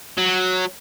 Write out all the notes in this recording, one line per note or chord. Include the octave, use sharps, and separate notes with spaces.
F#3